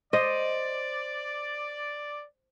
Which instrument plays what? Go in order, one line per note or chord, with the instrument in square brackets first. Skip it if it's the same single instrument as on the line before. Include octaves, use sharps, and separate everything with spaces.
[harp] C5 [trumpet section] D5 [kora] D#5